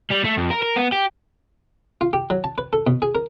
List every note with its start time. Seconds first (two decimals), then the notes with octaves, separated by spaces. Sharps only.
0.10 G3
0.24 A3
0.37 F2
0.50 A#4
0.62 A#4
0.76 B3
0.92 G4
2.01 F4
2.13 G4
2.30 F#3
2.44 A5
2.58 B4
2.73 A4
2.87 B2
3.02 G#4
3.15 A#4